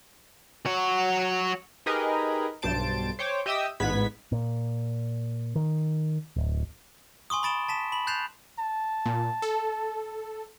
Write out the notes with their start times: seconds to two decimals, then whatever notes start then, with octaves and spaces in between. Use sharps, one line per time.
0.65 F#4 C#5
1.86 D#4 G4 G#4 A#4 B4 D#5
2.62 B1 G2 C5 A5 D7
3.19 C5 C#5 G5 D6
3.46 G4 D#5 E5 G5 D#6 E6
3.80 A1 G#2 B3 B4 G#6 B6
4.32 A#2
5.56 D#3
6.36 D1
7.30 G#5 C6 C#6 D#6
7.43 B5 D#6 A6 D7 E7 G7
7.69 A5 B6 E7
7.92 B5 F#7
8.07 F#6 G6 A6 C7 E7 F7
8.59 A5
9.06 A#2
9.42 A4